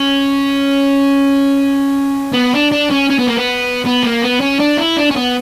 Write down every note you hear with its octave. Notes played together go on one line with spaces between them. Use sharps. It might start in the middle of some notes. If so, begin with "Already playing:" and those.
Already playing: C#4
B3
D4
D4
C#4
C#4
B3
A#3
B3
B3
A#3
B3
C#4
D4
E4
D4
C#4
B3